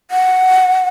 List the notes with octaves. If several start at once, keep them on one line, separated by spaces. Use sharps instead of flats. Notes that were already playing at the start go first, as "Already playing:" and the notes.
F#5